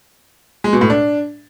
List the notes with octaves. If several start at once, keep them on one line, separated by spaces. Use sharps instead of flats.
G#3
B2
A2
D4